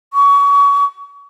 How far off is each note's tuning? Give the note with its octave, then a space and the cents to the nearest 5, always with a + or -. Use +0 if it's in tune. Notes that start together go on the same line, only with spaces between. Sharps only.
C#6 +30